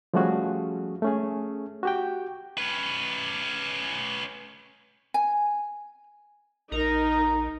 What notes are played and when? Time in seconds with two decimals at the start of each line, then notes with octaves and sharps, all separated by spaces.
0.14 F3 G3 A3 C#4 F#4 G#4
1.02 A3 C#4 G#4
1.83 F#4 G4 G5
2.58 C#4 B4
5.14 G#5
6.72 A#1 D#4 A#4 A#5